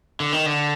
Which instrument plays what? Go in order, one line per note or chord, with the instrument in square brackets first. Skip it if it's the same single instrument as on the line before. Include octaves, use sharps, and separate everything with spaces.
[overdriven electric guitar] D3
D#3
D3